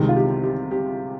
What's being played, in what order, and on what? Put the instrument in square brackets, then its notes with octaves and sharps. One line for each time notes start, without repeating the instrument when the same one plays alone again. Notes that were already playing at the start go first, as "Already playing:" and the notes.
Already playing: [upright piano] C2 C3 D#3 G#3
F4
G4
G4
G4